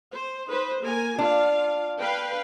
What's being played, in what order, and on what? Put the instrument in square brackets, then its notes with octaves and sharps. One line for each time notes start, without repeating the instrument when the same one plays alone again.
[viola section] C5
D#4 B4 C5
A#3 A#4 G#5
[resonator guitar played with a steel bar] D4 [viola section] F4 F5
[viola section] B4 F5 G5